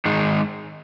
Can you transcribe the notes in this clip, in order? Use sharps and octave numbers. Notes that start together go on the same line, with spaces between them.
G#2 D#3 G#3 D#4